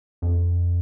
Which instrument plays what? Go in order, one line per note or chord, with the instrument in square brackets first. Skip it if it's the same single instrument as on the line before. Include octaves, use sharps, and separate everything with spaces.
[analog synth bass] F2